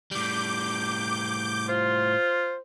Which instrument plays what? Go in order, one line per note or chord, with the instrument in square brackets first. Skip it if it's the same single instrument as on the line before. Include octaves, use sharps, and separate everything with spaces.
[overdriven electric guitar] A2 G3 [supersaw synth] D6 G6
[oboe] F4 [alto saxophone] C5